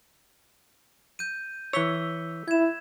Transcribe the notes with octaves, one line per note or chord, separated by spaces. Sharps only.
G6 D#7
E3 C#5 E6 B6 G7
E4 G#6 E7